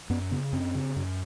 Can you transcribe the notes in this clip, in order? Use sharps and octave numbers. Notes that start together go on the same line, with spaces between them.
F#2 B3
C#3 B3
F#2 C4
C#3
F#2